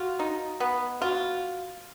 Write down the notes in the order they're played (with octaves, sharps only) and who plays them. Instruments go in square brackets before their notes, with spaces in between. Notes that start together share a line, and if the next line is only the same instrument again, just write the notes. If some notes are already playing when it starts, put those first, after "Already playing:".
Already playing: [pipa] F4 [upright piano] F#4
[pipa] D#4
B3
[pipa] F4 [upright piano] F#4